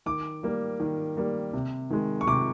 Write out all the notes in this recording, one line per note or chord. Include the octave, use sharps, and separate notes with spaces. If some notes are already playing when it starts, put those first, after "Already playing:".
D#3 D6
G3 A#3
D#3
G3 A#3
C3
D#3 G#3
C#6
C3 D6